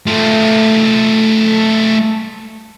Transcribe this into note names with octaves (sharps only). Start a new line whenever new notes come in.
A3 F4